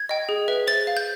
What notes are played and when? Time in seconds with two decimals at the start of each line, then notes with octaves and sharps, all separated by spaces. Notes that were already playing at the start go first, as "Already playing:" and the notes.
Already playing: G#6
0.09 D#5 G5
0.29 G#4
0.48 B4 E5
0.67 C5 A6
0.87 F5
0.97 G6